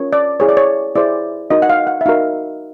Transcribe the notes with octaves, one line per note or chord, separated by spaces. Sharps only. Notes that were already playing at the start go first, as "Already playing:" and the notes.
Already playing: C#4 F4 A#4 C#5
D5
E4 G#4 C5 C#5
D5
C#5
E4 G#4 C5 D5
D#4 F#4 A#4 D#5
F#5
F5
F#5
E5
D#4 F#4 A#4 F5